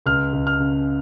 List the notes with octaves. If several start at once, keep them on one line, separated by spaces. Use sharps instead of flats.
C#2 F6
C#2
F6
C#3